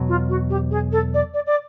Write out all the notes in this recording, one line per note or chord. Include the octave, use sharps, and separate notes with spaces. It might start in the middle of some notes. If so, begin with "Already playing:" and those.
Already playing: E2 B2 F#3
F4
F#4
G4
G#4
A4
D5
D5
D5